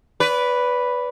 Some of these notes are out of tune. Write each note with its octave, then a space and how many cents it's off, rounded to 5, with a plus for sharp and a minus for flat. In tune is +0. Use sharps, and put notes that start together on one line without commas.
B4 +0 D5 -30